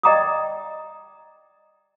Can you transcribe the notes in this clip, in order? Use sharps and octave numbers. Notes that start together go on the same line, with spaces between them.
D5 D#5 G5 A#5 D6 D#6